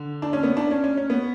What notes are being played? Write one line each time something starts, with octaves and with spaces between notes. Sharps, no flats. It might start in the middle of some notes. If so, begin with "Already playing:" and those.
Already playing: D3
D4
C#4
B3
D4
C#4
C#4
C#4
B3